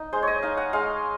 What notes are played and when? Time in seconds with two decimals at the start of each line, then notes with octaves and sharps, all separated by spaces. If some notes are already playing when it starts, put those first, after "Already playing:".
Already playing: D#4
0.13 G#3 C5
0.23 C#5 D#5
0.43 D#4 F5
0.57 F#5
0.73 G#3 F5